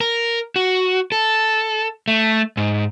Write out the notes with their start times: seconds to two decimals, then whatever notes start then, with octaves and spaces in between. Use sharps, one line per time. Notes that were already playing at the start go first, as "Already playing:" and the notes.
0.01 A#4
0.56 F#4
1.12 A4
2.08 A3
2.57 G#2